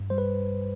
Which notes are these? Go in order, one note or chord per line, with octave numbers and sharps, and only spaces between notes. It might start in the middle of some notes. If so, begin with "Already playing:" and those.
Already playing: G2
G3 C5
B4